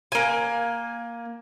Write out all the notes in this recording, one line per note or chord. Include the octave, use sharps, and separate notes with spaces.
A#3 G#5